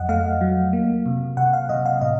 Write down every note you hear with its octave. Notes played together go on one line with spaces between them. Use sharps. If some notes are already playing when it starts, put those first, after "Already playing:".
Already playing: F2 F#3 D#5 F#5
A3 F5
F#3
A#3
C3
C3 F#5
F5
C3 D#5
F5
A2 D#5